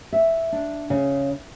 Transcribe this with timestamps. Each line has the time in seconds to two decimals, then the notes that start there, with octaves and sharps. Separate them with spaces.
0.12 E5
0.52 D4
0.90 C#3